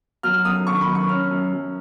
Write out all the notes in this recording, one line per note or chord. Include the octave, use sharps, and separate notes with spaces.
F#3 F6
F#2 D#6
D#3 C#6
B5
F#2
C#6
C#4 F6
F#2
F#2